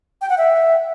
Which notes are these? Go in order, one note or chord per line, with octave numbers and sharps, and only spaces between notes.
G5
F#5
E5